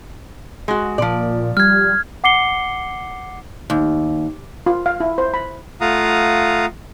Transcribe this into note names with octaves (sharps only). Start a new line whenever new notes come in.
G#3 F#4
A#2 F3 D5
G3 F6 G#6
F#5 D6 C7 C#7 G7
D#2
F4
F5
E4
C5
B5
A3 F4 F5 F#5 A#5 D#6